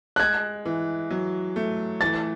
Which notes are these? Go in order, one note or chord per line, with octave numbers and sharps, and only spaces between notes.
F#6
G#3 G#6
E3
F#3
A3
E3 A6